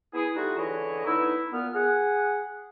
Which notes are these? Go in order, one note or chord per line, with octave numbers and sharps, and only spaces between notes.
B3 E4 G#4
G3 A3 D#4 F4 F#4
C#2 D3 E3 E4 C#5 D#5
D3 B3 D#4 E4
A#2 B3 F6
G#4 F#5